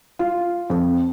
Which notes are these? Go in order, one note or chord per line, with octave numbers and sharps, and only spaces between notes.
F4
F2